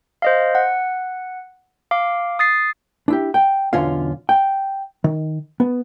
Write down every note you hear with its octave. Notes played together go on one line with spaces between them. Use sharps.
C5 D#5 F5
F#5
F5 D6
D#6 A6 C7
D4 E4 G4
G5
B1 E2 D3 C#4 F4 F5
G5
D#3
B3